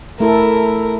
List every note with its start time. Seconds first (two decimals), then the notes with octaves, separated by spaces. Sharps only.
0.20 A3 E4 A4 A#4